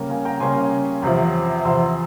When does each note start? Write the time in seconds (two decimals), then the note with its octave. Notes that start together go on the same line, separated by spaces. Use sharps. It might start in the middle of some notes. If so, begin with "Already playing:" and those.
Already playing: C#3 G3 A#3 C#4
0.10 F5 G#5
0.25 G5 A#5
0.40 C#3 G3 A#3 C#4 G#5 C6
1.02 E2 C3 F3
1.65 E2 C3 F3 C6 E6